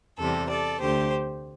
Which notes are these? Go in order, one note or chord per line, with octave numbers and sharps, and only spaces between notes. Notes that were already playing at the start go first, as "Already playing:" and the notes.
E2 C3 G3 A4
A4 D5
D2 D3 A3 G4 C5